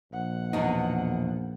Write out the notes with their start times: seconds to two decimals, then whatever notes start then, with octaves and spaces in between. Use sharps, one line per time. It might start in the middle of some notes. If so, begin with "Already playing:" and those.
0.13 A#1 F#5
0.53 E2 B2 D#4